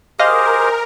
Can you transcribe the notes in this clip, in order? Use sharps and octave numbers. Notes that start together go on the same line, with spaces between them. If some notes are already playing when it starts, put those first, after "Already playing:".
G4 G#4 A#4 C5 D#5 F5